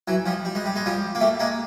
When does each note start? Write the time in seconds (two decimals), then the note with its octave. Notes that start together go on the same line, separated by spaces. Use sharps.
0.08 E3 F#3
0.26 F3 G3
0.45 G3
0.55 G#3
0.66 G3
0.76 G#3
0.86 F3 G3
1.15 A#3
1.20 G3 A3
1.40 G#3 A#3